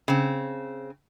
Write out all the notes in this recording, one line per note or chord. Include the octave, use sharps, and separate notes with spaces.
C#3 C4